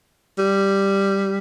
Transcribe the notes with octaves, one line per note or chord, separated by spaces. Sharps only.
G3